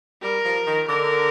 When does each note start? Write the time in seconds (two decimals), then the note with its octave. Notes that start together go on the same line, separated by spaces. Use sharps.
0.23 G3 A#4
0.45 F3
0.67 D#3
0.88 D3 A#4